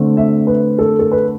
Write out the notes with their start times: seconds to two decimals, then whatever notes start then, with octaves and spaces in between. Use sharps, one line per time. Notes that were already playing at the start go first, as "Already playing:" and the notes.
Already playing: D3 A3 C4
0.17 E5
0.47 B4
0.79 A4
0.99 A4
1.12 B4